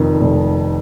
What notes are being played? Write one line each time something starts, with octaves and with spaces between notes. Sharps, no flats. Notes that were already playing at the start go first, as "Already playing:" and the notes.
Already playing: F1 F2 D#3
F1